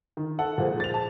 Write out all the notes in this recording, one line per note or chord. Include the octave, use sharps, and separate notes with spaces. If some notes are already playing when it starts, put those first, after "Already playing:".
D#3
A4 F#5
A#2 F3 G#3
A6 F7
A5